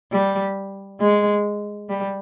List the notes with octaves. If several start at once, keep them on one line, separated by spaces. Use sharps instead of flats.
G3
G#3
G3